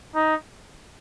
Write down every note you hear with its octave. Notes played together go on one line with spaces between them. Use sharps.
D#4